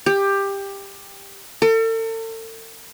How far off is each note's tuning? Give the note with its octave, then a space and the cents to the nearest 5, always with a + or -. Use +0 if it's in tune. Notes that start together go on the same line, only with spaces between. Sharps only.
G4 +15
A4 +40